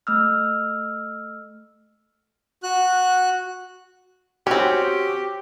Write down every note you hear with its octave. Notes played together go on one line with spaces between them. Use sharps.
A3 E6 F6
F#4 F#6
C4 C#4 F#4 G4